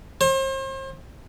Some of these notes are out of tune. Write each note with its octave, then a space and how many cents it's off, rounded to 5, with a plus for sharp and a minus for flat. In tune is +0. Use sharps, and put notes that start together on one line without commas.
C5 +40